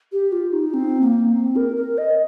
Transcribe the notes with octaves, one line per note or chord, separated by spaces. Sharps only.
G4
F4
D#4
C4
A#3
C4
A#4
A#4
D#5